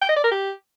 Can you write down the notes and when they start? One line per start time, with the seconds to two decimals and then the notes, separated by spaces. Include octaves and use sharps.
0.02 G5
0.09 D#5
0.17 D5
0.24 A#4
0.32 G4